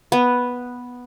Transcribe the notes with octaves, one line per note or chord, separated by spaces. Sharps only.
B3